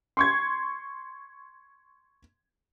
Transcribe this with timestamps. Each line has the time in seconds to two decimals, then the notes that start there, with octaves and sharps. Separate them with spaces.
0.17 C6 C#6 G#6